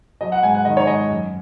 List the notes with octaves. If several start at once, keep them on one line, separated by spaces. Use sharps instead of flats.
F#3 D#5
F#5
G#2 G#5
F#5
D#3 D#5
C#5
G#2 D#5
F#2